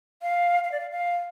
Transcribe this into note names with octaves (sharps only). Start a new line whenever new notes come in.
F5
F5
D5
F5
F5